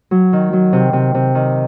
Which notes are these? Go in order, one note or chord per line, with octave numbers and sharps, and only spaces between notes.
F#3
D#3
F#3
C3
C3
C3
D#3